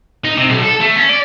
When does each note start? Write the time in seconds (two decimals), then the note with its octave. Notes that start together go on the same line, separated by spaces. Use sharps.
0.24 D#4
0.37 C3
0.49 B1
0.64 A4
0.81 A3
0.97 C#4
1.10 D5